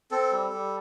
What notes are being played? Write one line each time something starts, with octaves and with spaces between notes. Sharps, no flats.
C4 A4
G3
G3